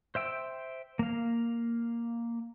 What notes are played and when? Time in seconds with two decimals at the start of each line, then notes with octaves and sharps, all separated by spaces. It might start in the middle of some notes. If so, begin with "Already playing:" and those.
0.15 C5 E5 G5 E6
0.99 A#3 F5